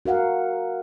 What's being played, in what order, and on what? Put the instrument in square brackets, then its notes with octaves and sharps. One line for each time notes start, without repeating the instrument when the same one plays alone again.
[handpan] F#4 A#4 F5 F#5